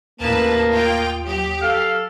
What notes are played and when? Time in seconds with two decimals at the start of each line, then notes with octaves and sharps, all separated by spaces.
0.20 A1 D#2 A#3 B4 A5
0.72 F4 G5
1.26 F#3 G4
1.62 A4 F5